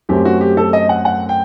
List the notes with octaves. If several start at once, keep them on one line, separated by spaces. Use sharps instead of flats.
F#2 F#3 A3 C4 G4
F#4
G4
A4
D#5
F#5
F#5
G5